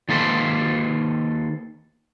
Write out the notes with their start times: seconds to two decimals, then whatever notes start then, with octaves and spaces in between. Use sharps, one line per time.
0.09 D#3 A#3 A4 B4 C5